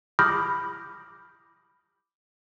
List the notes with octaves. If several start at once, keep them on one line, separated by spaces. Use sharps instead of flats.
B5 D6 D#6 F6 G6 A#6